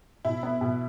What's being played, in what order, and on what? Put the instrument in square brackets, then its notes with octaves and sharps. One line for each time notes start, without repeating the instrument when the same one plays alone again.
[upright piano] B2 [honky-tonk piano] E4
[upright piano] B3
B2